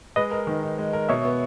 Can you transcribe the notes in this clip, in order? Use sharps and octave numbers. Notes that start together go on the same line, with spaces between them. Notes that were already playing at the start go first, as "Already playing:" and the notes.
G#3 B4 D#5
A#4
D#3
D#4
G#3
A#4
B2 C#5 E5
B3